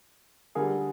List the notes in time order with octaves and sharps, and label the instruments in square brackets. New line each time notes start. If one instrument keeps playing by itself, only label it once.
[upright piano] D3 G3 G#4 A#4